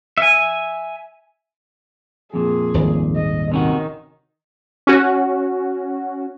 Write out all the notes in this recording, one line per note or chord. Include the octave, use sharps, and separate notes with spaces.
E5 G#5
F2 A#2 G#4
D#1 G#1
D#5
C3 D#3 C#4 F#4
C#4 F#4